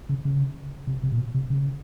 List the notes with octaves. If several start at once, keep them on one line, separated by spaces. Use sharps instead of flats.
C#3
C#3
C3
C3
A#2
B2
C3
C#3